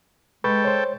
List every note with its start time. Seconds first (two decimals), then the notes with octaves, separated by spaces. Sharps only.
0.44 G#3 A4 B4 G5 B5 C#6
0.64 C5 C#5